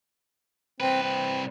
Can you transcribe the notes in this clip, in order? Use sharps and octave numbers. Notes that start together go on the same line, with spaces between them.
C2 C4 B4
C4